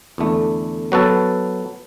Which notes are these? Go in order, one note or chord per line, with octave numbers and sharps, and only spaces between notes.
E2 D3 A3
F#3 B3 F#4 A4